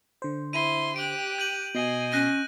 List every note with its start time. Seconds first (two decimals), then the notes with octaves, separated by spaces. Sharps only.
0.22 D3 C5
0.53 E4 C6 D#7
0.96 G4 F#6 D7
1.38 G6 D#7 F#7
1.75 B2 D#5 G#5 C7
2.13 C#4 F#6 A#6 D#7